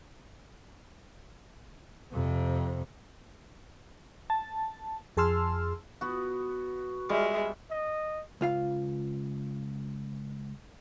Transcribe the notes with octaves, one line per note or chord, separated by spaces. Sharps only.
F2 C3
A5
F2 G#4 A5 C6 E6 F6
B3 F#4
G3 G#3 E5
D#5
C#2 F4 F5